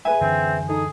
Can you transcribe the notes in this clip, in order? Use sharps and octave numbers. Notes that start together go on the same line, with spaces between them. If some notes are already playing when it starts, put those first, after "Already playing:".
G#4 B4 E5 G#5
F#2 D3 E3 C4
D#4 G#4 A4